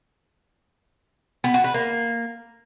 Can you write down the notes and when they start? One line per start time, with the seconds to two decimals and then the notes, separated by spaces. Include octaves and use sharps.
1.44 B3
1.54 F#4
1.64 B4
1.74 A#3